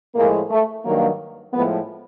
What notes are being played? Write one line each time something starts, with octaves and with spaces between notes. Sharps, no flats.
A2 F3 G#3 A#3
A3
G2 D#3 F#3 A#3
A2 F3 G#3 B3